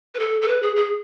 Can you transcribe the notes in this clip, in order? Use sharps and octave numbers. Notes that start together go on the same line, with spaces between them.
B4
A4
A4
B4
G#4
G#4